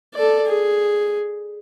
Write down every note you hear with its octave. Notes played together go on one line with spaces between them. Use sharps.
A4 D5
G#4